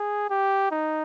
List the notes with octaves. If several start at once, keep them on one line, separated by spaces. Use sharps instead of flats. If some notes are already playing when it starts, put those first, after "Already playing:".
Already playing: G#4
G4
D#4